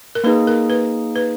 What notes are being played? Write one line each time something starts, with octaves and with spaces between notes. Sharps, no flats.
A#4
A#3 D#4 G#4 B4
A#4
B4
B4